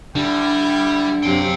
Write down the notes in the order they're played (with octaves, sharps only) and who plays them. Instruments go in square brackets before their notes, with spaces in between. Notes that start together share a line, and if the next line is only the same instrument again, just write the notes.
[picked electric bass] D3 [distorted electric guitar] G3 [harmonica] E4 G5
[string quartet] F#2 C3 [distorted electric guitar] F5 G5